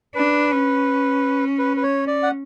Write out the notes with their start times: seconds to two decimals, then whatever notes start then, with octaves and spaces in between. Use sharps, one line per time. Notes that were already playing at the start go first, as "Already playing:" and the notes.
0.15 D4 B4
0.51 C#4
1.59 B4
1.77 B4
1.83 C#5
2.07 D5
2.23 F#5